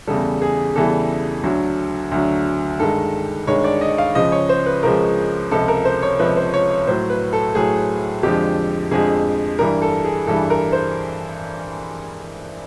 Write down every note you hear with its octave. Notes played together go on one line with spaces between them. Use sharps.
E2 C#3 E3 G3 A4
G#4
E2 C#3 E3 G3 A4
D2 D3 F#3
D2 D3 F#3
G2 D#3 G#3 A4
G2 D#3 G#3 C#5
D5
D#5
F5
C#2 C#3 F3 G#3 D#5
C#5
C5
B4
C#2 C#3 F3 G#3 A#4
C#2 C3 F3 A4
A#4
C5
C#5
C#2 C3 F3 B4
C5
C#5
C#5
A2 F#3 C5
B4
A4
A2 F#3 G#4
F2 D3 F3 G#3 G4
F2 D3 F3 G#3 G#4
G2 E3 G3 A#4
A4
G#4
G2 E3 G3 A4
A#4
C5